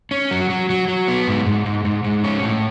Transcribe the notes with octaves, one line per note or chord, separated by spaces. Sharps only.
C#4
F#3
F#3
F#3
F#3
B3
G#2
G#2
G#2
G#2
G#2
C#4
A2